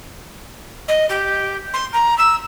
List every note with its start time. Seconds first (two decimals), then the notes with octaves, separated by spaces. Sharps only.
0.88 D#5
1.09 G4
1.74 C6
1.93 A#5
2.18 E6